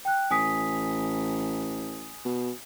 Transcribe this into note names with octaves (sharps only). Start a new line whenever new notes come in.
G5 F#6
A1 G#5 D#6 B6
B2